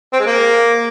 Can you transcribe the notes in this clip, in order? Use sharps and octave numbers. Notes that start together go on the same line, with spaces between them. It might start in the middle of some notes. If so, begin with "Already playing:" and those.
C4
G#3
A#3